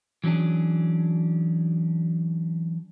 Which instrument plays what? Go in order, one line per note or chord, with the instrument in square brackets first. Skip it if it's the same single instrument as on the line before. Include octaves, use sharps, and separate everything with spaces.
[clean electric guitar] E3 F#3 C#4 D4 G#4